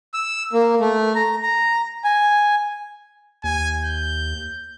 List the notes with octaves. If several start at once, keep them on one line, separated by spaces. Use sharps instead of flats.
E6
A#3
A3
A#5
A#5
G#5
D#2 G#5
G6